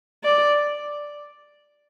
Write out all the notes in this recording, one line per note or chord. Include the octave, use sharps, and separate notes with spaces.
D5